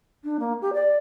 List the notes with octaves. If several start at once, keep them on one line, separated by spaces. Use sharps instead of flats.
D4
A#3
G4
D5